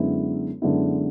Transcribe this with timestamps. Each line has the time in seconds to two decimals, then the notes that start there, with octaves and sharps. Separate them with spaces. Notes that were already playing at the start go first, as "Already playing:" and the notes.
Already playing: F#2 D3 G#3 B3 E4
0.62 F#2 D3 G#3 B3 E4